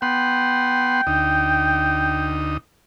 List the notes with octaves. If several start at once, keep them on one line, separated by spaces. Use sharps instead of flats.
B3 F#5 G5 C6
D2 D#4